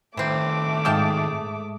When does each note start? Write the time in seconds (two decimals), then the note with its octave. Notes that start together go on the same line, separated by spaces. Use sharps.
0.17 A2 D#3 E3 A3 C4 D6
0.85 G#2 G#3 F5 G5 A5 D#6